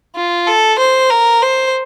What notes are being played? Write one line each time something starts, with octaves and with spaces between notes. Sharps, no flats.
F4
A4
C5
A#4
C5